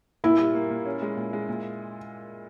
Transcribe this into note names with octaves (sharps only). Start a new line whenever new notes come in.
A#2 E4
G3
A#3
A#2
C#4
G#3
A#2
G#3
A#2